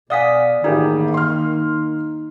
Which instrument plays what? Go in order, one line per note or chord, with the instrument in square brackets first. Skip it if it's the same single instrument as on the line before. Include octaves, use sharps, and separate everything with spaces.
[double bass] B2 [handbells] D5 D#6 B6 [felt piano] F5 F#5 G#5
[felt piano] A1 G4 G#4 [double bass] D#3 A#3 [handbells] D#4
[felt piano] C6 F6